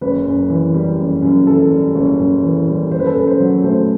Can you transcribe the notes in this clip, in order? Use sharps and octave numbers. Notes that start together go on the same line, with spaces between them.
F#1 B4
F#2
E3
G3
F#1
F#2
E3 A4
G3
F#1
F#2
E3
G3
F#1 C5
B4
A4
F#2 B4
C5
F#3
A3 C5